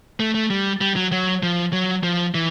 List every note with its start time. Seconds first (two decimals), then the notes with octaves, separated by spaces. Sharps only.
0.20 A3
0.34 A3
0.50 G3
0.81 G3
0.96 F#3
1.12 F#3
1.43 F3
1.73 F#3
2.03 F3
2.34 E3